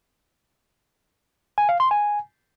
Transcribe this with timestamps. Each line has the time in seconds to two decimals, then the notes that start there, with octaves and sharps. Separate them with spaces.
1.58 G#5
1.69 F5
1.80 C6
1.91 G#5